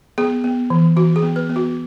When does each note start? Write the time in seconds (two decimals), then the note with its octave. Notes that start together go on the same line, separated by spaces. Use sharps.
0.18 B3 G#4
0.44 B3
0.70 E3
0.96 E3 F#4
1.16 G#4
1.23 B3
1.36 B4
1.49 B3
1.56 F#4